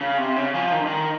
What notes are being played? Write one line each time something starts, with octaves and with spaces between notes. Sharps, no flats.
C#3
C3
C#3
F3
D#3
D3
D#3